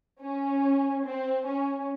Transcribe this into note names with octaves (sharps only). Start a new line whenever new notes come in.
C#4
C4
C#4